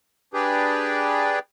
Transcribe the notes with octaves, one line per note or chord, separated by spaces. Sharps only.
D4 G4 G#4 B4 D5 G5